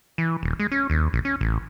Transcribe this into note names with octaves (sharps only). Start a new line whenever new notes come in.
E3
D#1
G#3
C#4
D#2
A#1
C#4
A1